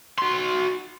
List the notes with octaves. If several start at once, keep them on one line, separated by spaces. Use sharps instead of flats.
F#4 C6